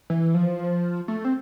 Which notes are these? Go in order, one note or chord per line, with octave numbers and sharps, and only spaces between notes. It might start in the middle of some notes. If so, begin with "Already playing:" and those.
E3
F3
A3
C4